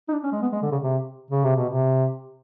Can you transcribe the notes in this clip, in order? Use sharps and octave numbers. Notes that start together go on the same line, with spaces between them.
D#4
D4
C#4
G#3
B3
G#3
D3
C#3
C3
C#3
C3
B2
C3